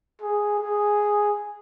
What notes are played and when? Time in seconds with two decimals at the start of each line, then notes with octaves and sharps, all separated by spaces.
0.22 G#4
0.59 G#4